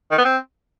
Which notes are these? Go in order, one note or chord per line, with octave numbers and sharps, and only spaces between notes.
D#3
B3
C4